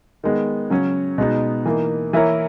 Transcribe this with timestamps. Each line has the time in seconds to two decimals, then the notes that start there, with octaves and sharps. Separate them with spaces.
0.24 D#3 G#3 B3
0.70 C#3 F#3 C#4
1.18 B2 G#3 B3 D#4
1.65 E3 A#3 D#4
2.13 E3 A#3 E4 A#4 C#5